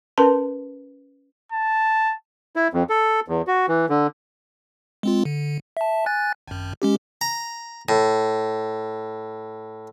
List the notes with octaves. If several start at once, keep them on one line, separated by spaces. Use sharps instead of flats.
C#4 A#4 B4 A5 C6
A5
E4
F2
A4
E2
F#4
E3
D3
G#3 C4 F4
D3
E5 A5
G#5 F#6 A6
G#1 F#2
G#3 C#4 G4
A#5
A2